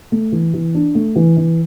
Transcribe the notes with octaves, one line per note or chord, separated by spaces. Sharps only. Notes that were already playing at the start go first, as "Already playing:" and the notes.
A3
E3
E3
D4
A3
E3
E3